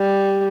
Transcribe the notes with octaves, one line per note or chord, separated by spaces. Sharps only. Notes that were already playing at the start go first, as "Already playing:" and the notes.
Already playing: G3